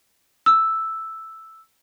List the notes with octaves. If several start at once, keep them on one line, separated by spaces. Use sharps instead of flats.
E6